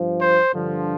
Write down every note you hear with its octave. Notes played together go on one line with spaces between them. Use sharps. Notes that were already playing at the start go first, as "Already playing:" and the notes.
Already playing: G2 F3
C5
G2 D3 F3